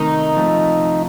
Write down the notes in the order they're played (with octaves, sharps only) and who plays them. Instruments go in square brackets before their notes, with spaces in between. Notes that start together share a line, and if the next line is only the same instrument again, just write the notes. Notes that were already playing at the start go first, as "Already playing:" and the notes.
Already playing: [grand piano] C3 D#3 A3 [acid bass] D#4
[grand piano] C3 F3 A3